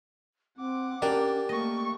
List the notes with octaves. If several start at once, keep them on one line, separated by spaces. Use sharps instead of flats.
C4 F#5 D6
A#3 C#4 D4 G4
A3 A#3 D#5 C#6